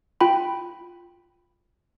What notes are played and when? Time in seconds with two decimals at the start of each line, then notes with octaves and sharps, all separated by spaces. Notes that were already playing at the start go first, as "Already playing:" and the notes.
0.21 F4 G5 B5